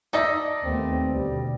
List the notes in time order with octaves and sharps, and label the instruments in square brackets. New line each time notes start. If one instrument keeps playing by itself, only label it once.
[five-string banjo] D#4 A4 E5 [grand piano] D5 D#6 A#6
[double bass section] D#2 A3 B3 [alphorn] C4
[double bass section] D2 B2 [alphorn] G3